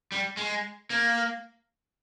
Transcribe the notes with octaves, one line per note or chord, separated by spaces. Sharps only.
G3
G#3
A#3